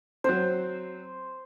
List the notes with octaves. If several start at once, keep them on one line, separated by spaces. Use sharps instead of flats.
F#3 C4 C5